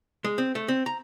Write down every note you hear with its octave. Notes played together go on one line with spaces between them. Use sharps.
G#3
C4
A3
C4
A#5